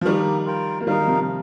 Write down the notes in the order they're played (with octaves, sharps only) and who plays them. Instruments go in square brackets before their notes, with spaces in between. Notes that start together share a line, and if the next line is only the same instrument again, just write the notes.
[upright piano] F3
[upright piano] D#3 G3 [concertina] A#3 D#4 G4 A#4
[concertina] F4 A#4 G5
[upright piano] A#3
[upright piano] D#3 G3 [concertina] D#4 A#4 F5
[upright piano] G3
C3 F3